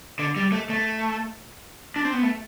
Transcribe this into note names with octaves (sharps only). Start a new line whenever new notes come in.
D3
G3
A3
A3
D4
C4
B3
A3